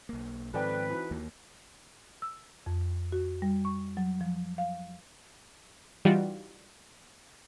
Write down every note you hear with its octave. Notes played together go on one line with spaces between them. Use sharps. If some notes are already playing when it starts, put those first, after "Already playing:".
B1 A#3
G#2 D#3 F3 C4 A4 B4 D5 G5
E3 D#4 F#4
D#2 A#3
E6
F2
F#4
G3
C#6
F#3
F3
F5
E3 G3 D#4 F4 F#4 D5